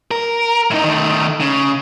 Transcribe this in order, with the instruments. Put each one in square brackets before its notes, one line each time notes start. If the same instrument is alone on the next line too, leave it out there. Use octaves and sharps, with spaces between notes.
[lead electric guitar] A#4
A2 D#4
D#3 A3
C#3